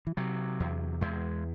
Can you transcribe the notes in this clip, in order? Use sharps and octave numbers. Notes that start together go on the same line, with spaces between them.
E3
C3 F#3
E2
E2 G#3